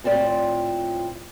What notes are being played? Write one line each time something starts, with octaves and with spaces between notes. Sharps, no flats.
A2 C4 F4 D5